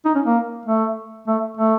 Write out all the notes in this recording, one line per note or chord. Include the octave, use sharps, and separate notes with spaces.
D#4
C#4
A#3
A3
A3
A3